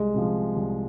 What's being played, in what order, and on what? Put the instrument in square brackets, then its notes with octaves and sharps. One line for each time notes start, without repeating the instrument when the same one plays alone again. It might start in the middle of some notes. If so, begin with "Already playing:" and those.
Already playing: [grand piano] C2 [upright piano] G#3
[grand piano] C3 F3
C2